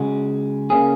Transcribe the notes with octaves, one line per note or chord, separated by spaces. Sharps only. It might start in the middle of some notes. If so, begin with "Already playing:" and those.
Already playing: C#3 G#3 F#4
C#3 A#3 C#4 G#4